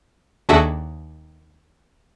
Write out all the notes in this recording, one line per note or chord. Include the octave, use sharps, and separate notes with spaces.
D#2 D4 F#4 G#4 A4 E5